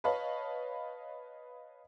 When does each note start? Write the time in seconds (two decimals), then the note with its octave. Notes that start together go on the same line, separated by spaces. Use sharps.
0.04 B4 C#5 D#5 F5 A5 B5